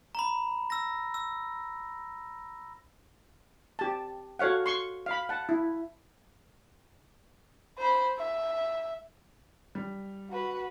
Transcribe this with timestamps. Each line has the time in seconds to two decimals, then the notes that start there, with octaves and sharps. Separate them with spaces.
0.15 A#5 B5
0.70 E6 A#6
1.14 E6
3.79 G4 A5
4.39 F#4 A4 C#5 F5 F#5
4.66 C6 C#6
5.06 F5 B5
5.29 F#5 A5
5.49 E4
7.78 C5 B5
8.18 E5
9.75 G3
10.30 F#4 B4